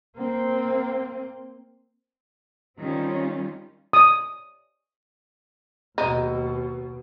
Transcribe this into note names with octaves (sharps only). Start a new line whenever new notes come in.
A#3 C4
D#3 G3 C4 C#4 F4
D#6
D#2 B2 G#3 D#4